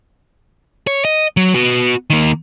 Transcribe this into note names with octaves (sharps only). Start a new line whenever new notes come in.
C#5
D#5
F#3
B3 F#4
D#3 A#3